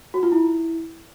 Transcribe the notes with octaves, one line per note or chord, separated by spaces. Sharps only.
F#4
F4
E4